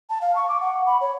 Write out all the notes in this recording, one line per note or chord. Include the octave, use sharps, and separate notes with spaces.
A5
F5
C#6
D6
F#5
B5
C#5